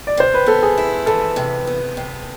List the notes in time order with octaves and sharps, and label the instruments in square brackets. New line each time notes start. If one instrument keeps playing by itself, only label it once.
[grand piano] D5
[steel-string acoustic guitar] C3 [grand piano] C5
[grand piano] B4
[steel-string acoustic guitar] B3 [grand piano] A4
[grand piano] G#4
[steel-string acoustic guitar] E4
[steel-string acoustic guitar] E3 [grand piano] A4
[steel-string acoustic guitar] C3
B3
C3